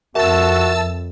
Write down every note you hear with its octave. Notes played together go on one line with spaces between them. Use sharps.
F2 F#4 A#4 E5 A5 E6